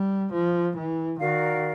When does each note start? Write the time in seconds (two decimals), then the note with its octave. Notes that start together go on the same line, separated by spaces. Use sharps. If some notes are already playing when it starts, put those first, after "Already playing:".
Already playing: G3
0.33 F3
0.76 E3
1.19 D#3 F#4 A#4 D5 F5